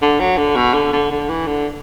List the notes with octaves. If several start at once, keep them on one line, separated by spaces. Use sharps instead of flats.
D3
F#3
D3
B2
D3
D3
D3
E3
D3